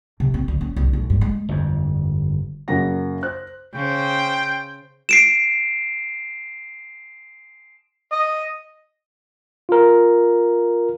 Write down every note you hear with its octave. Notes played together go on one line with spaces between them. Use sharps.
C3
C4
D2
C#4
C2
E1
G2
G#3
G1 F2
F#2 C#3 A#3 F#5 A#6
C5 F#6
C#3 C5 G5
C7 D7 E7
D#5
F4 A#4